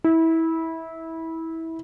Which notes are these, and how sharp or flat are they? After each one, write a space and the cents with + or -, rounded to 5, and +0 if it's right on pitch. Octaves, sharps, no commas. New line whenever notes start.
E4 -20